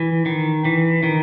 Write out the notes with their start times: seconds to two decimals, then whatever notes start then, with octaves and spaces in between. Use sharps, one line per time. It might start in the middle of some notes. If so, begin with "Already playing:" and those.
Already playing: E3
0.26 D#3
0.65 E3
1.03 D#3